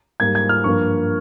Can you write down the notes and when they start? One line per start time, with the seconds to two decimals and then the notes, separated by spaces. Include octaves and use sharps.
0.20 G#2 G3 A#3 G#6
0.35 G#6
0.49 F6
0.64 G2 F3 A#3 C#6